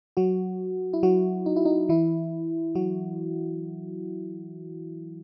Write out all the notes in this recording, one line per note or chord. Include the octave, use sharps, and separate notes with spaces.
F#3 F#4
E4
F#3 F#4
D#4
E4
D#4
E3 E4
F#3 F#4